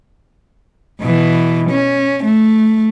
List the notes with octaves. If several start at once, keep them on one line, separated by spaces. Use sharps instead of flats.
B2 E3
C#4
A3